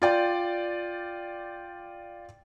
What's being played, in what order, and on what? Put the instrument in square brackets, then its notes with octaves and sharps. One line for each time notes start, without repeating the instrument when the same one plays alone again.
[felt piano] F4 D5 G5